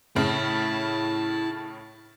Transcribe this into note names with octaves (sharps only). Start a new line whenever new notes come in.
A2 C#3 E4 A5